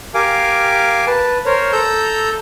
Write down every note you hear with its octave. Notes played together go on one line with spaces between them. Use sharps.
G4 A#4 F5 G#5 D6
B4 A5
A#4 C5 C#5
A4 A#5 E6 G6